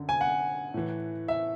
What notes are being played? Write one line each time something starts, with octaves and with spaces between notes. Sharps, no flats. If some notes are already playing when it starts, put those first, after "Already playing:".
Already playing: F#2 D3
G#5
F#5
A2 E3
E5